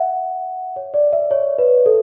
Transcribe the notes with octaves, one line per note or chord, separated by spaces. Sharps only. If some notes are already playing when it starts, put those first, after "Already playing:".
Already playing: E5 F#5
C#5
D5
E5
C#5
B4
A4